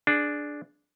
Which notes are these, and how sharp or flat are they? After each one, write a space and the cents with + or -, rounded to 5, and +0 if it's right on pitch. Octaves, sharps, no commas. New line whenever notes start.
D4 +0 G#4 +20